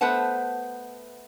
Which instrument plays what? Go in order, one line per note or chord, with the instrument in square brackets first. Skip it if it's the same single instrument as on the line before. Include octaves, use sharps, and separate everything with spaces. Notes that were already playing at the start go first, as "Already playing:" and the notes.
[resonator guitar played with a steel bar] A3 B3 B4 C5 F#5 A5